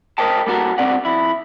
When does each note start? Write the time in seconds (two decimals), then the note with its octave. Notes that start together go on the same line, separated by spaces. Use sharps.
0.18 A#4 C5 D#5 G5 A5
0.47 G3 A#3 F#4 A4 A#4
0.78 G2 C3 C4 D5 F#5
1.05 F2 E4